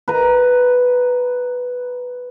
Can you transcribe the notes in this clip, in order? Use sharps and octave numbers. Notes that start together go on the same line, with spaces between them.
B4 A#5